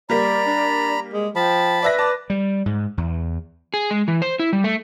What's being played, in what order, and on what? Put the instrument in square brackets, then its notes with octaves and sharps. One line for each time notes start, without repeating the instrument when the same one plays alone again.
[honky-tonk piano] G3 A#3 [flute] D5 [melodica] A#5 B5
[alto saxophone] D4
G#3
[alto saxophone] F3 [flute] G5 [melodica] A5 B5
[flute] B4 [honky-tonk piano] D5 E5 A#6
[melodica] D5 [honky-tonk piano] A5
[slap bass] G3
G#2
E2
[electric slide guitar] G#4
G#3
E3
C5
E4
G3
A3